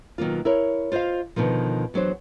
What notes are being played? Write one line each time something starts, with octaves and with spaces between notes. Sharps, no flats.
B2 D#3 F#3 A#3 F4
E4 A#4 C#5
F4 C5 D5 D#5 F5
B2 D3 D#3 F3
E2 F#3 D4 C5